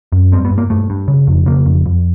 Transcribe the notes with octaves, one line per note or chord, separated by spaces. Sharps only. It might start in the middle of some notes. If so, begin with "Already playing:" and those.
F#2
G2 C4
B3
G2
A#3
G2 A3
G2
C#3
F2
C#3 A#3
F2
F2